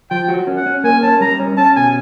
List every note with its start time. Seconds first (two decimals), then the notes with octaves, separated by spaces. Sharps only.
0.11 F3 G5
0.28 F#4
0.47 C#4
0.57 F#5
0.66 C#4
0.84 A#3 G#5
1.02 C#4 A5
1.20 G3 A#5
1.39 C#4
1.57 C#4 A5
1.76 B2 G#5